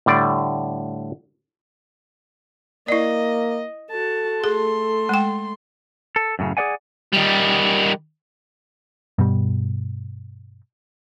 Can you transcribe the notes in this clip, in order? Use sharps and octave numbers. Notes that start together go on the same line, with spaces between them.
A2 D3 G3 D5
A#3 E4 D5 D#5
F#4 A4 A5
A3 G#4 C6
G#3 G5
A4
F#2 A2 C#3
G#4 C5 D5 F#5 G#5
D#3 G3
G2 B2 G3